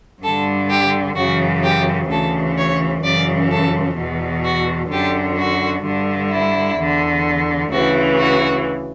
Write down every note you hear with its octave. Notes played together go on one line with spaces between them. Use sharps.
G2 D3 A4
G4
F#2 C#3 E3 F#4
G4
D2 C#3 E3 A4
C#5
F#2 C#3 E3 D5
A4
E2 B2
F#4
F#2 D3 G4
F#4
G2 D3
E4
E2 D3
D2 C#3 E3 F#4
F#4